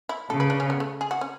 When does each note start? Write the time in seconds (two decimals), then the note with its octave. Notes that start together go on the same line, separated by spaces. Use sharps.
0.09 E4
0.29 C#3 A4
0.40 B4
0.50 D4
0.60 C#4
0.70 B3
0.80 A3
1.01 G#4
1.11 F#4
1.21 C#4